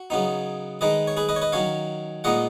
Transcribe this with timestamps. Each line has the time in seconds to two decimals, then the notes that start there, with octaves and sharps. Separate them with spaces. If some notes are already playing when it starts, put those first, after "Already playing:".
Already playing: F#4
0.10 C#3 F#3 B3 D#4
0.81 D#3 G#3 D#4 B4 D#5
1.07 C#5
1.17 G#4 B4
1.29 B4 D#5
1.36 C#5
1.42 B4 D#5
1.52 D#3 F#3 C#4 C#5 F5
2.24 A#2 G#3 B3 D#4 D#5 F#5